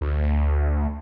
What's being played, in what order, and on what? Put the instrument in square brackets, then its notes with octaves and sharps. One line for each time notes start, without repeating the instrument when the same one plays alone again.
[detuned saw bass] D2